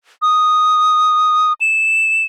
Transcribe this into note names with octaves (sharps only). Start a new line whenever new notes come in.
D#6
E7